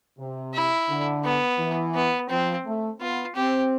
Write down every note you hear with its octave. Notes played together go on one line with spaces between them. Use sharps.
C3
E4
D3
B3
E3
B3
F3 C4
A3
B3 F4
C4 G4